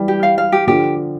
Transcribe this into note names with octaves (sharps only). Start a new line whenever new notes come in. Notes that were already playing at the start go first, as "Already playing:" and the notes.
Already playing: E3 G3
G4
F5
F5
G4
D3 F3 G4